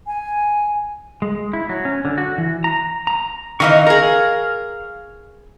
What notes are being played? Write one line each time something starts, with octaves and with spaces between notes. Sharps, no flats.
G#5
G#3
E4
F#3
C#4
D3
F#4
E3
A#5
A#5
D#3 E3 D#5 F5 C#6
G#4 A#4